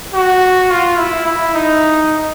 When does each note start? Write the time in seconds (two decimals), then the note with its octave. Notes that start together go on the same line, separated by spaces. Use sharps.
0.14 F#4
0.71 F4
0.98 E4
1.26 E4
1.54 D#4